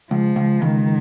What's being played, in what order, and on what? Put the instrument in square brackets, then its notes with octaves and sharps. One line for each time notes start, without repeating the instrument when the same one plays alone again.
[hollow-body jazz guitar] C#2 [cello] F3
[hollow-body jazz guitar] C#2
[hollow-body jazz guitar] C#2 [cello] D#3